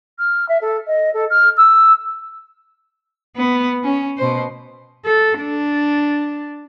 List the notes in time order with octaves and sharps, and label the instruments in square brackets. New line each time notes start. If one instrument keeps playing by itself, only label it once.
[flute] F6
E5
A4
D#5
A4
F6
E6
[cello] B3
C#4
B2 C5
A4
D4